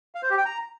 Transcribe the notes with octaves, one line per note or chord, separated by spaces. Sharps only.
F5
C5
G4
G5
A#5